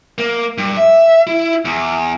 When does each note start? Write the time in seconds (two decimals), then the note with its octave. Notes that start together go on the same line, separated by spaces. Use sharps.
0.18 A#3
0.58 G2
0.77 E5
1.27 E4
1.65 E2